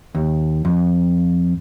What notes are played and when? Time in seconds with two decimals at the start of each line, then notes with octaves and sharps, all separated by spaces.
0.15 D#2
0.65 F2